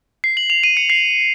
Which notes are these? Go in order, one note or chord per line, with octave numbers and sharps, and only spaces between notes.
C7
F#7
F7
D#7
C#7
C7